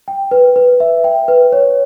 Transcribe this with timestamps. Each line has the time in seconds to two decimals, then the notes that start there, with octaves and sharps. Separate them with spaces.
0.08 G5
0.31 B4
0.56 B4
0.80 E5
1.04 G5
1.28 B4
1.52 C#5